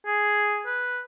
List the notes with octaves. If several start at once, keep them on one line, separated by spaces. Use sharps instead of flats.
G#4
B4